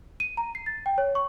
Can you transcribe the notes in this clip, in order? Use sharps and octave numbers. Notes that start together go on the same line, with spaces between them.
D#7
A#5
C7
A6
G5
C#5
C#6